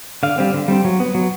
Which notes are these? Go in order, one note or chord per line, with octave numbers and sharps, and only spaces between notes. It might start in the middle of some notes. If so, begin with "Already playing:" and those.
D3 F5
G3 C4
D3
G3 C4
F#3
B3
F#3